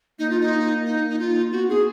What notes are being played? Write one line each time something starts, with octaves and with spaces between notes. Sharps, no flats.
A#3 D#4
F4
D#4
D#4
D#4
F4
B3 F#4
D#4 G#4